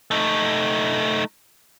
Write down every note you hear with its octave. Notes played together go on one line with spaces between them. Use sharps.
A3 D#4